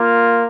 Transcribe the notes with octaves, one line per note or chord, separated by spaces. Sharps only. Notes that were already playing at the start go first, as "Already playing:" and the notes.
Already playing: A#3 F4